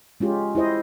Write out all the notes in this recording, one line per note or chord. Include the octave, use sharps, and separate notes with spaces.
G#3 C#4 F4 G4
E4 G4 C5 D#5